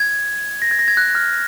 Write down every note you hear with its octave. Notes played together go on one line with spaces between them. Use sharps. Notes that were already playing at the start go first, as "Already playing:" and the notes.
Already playing: G#6
A#6
G#6
A#6
G#6
F#6
F6